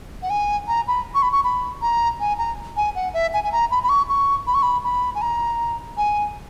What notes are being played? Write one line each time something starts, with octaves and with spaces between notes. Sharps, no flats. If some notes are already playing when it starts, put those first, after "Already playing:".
F#5
G#5
A#5
B5
C#6
B5
C#6
B5
A#5
G#5
A#5
G#5
F#5
E5
G#5
G#5
A#5
B5
B5
C#6
C#6
B5
C#6
B5
B5
G#5
A#5
G#5